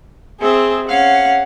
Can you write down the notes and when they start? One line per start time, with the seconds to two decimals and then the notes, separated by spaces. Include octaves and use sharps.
0.41 C4 G#4 E5
0.88 C#4 F5 F#5